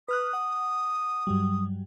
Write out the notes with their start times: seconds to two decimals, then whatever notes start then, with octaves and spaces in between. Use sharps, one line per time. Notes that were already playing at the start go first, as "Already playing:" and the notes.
0.08 B4 D#6 F6 F#6
0.33 F#5
1.27 G2 F#3 G3